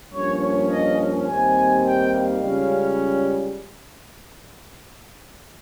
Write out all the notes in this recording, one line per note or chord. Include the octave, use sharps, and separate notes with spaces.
G2 F3 A#3 C#4 C#5
C#5
D#5
D#2 D#3 G3 C4 G#5
G5
F5
C#2 C#3 G3 C#4